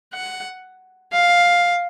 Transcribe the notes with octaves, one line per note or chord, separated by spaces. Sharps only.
F#5
F5